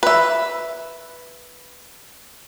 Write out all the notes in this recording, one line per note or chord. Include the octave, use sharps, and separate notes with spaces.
B4 E5